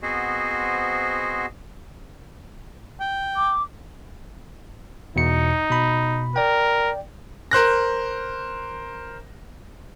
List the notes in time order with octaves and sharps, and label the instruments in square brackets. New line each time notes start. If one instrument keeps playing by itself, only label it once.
[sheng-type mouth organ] B3 C4 F#4 G#4 C5 D#5
[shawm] G5
[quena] D6
[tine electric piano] E2 B2 C#7 [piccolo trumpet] D#4
[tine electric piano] B2 B5
[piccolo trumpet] A#4 [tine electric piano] D5 G5
[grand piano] A#4 C5 F#6 A#6